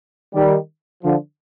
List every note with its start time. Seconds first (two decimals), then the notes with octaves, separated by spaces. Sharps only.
0.34 D#3 G3
1.04 D3 F3